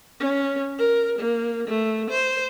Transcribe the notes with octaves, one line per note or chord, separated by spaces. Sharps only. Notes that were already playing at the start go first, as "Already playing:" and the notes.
C#4
A#4
A#3
A3
C5